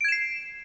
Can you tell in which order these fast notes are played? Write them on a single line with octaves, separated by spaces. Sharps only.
D7 G#6 E7 C7